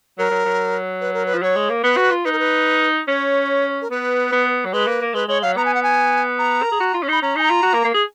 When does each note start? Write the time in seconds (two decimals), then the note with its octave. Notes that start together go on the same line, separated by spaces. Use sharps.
0.18 F#3 A#4
0.31 F#3
0.45 F#3
1.01 B4
1.14 A#4
1.26 B4
1.34 F3
1.42 F#3 C#5
1.56 G#3
1.70 A#3
1.84 B3 B4
1.97 F#4
2.11 F4
2.25 D#4 B4
2.32 A#4
2.39 B4
3.08 C#4 C#5
3.82 A#4
3.91 B3 B4
4.33 B3
4.65 F#3
4.73 G#3 B4
4.87 A#3
5.02 A#3
5.14 G#3 B4
5.28 G#3 C#5
5.42 F#3 F5
5.57 B3 A#5
5.65 G#5
5.75 F#5
5.83 G#5
6.39 A#5
6.63 A#4
6.72 G#4
6.80 F#4
6.94 F4
7.03 C#4
7.08 D#4 B5
7.22 C#4 A#5
7.36 D#4 G#5
7.43 A#5
7.50 F4
7.63 F#4
7.74 A#3
7.85 A#3
7.94 G#4